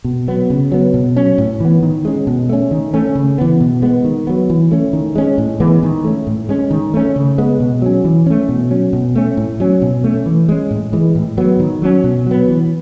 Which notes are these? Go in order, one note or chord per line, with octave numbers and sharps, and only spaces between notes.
B2
F#3 B3
C#3
F#3 B3
B2
F#3 C#4
A2
E3 B3
D#3
G#3 C#4
B2
A3 C#4
D#3
A3 C#4
C#3
E3 B3
B2
G#3 B3
D#3
F#3 B3
E3
A3 C#4
D#3
G#3 C#4
A2
E3 G#3 B3
D#3
A3 C#4
A2
G#3 C#4
D#3
A3 C#4
C#3
G#3 B3
B2
F#3 C#4
E3
A3 C#4
B2
F#3 C#4
B2
A3 C#4
A2
F#3 C#4
B2
A3 C#4
E3
G#3 C#4
A2
E3 G#3
A2
F#3 B3
D#3
F#3 C#4
B2
F#3 B3
E3